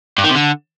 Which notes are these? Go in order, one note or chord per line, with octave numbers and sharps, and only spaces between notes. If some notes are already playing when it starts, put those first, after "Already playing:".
G2
D#3
C3
D3